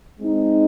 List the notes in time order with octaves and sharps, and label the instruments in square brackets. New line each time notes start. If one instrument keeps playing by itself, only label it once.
[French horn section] G#3 C4 D#4